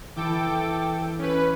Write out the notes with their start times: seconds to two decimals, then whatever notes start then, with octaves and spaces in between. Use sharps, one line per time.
0.16 E3 E4 A4 G5 D6
1.19 C#4 B4